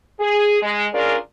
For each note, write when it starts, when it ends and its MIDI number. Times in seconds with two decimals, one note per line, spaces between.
0.20 0.59 68
0.63 0.87 56
0.94 1.17 61
0.94 1.17 62
0.94 1.17 65
0.94 1.17 68
0.94 1.17 70
0.94 1.17 74